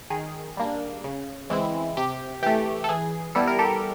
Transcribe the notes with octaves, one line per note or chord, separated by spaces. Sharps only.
D#3 G#4
G3 A#3 D4
C#3
E3 G#3 C4 E4
C3 G4
E3 A3 G4
A4
E3 G#4
G3 B3 E4 A4
A#4
G4 A4